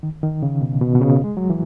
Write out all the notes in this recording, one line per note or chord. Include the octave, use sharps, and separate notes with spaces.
D#3
D#3
C#3
B2
B2
B2
C#3
G#3
F#3
E3